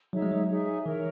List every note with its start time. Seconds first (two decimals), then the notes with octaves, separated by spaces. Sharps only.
0.13 F#3 D#4 G#4 C#5 E5
0.22 G#3
0.31 F#3
0.50 D#4 G#4 C#5 E5
0.85 E3 A#4 C#5 E5